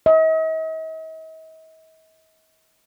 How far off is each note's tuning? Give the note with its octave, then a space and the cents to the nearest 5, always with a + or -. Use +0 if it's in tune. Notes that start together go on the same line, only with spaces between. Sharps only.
D#5 +45